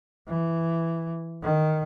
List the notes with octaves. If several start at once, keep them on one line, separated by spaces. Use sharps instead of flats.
E3
D#3